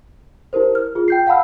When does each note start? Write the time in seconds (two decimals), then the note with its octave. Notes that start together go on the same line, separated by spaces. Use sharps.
0.53 E4 G4 A#4 C5
0.75 F6
0.95 F4 G#4
1.08 G5 G6 C7
1.27 F5 F#5 A5 B5 E6 F6